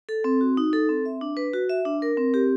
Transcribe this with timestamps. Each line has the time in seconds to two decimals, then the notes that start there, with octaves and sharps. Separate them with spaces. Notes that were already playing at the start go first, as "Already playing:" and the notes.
0.09 A4
0.24 C4
0.41 F#4
0.57 D#4
0.73 A4
0.89 C4
1.05 E5
1.21 D4
1.37 B4
1.53 F#4
1.70 E5
1.85 D4
2.02 A#4
2.17 C4
2.34 G4